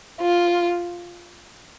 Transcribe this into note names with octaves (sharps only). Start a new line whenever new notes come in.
F4